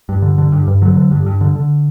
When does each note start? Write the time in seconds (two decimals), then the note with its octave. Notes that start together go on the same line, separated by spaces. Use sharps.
0.09 G2
0.22 D3
0.38 D3
0.52 G2
0.67 G2
0.82 D3 F#3
0.96 D3
1.11 G2
1.26 G2
1.41 D3
1.56 D3